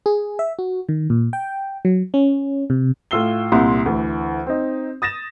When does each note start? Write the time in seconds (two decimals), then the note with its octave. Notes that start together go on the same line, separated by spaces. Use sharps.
0.06 G#4
0.39 E5
0.59 F#4
0.89 D#3
1.10 A#2
1.33 G5
1.85 F#3
2.14 C#4
2.70 C3
3.11 A2 F4 E6 C7 G7
3.52 C2 A#2 E4 C6
3.86 D2 E3
4.46 C4 D#4
5.02 D#6 A6 A#6 E7